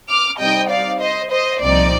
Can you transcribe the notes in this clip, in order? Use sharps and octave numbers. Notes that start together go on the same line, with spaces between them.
D6 F6
C3 G3 C4 D#4 D#5 G5
D5 F5
C5 D#5
C5 D#5
C2 A#2 F3 C4 D#4 D5